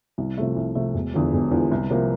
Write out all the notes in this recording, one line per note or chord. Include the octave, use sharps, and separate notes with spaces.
C2
C3 F3 A3
C2
C3 F3 A3
E1
E2 D3 F3
E1
E2 D3 F3
C2
C3 F3 A#3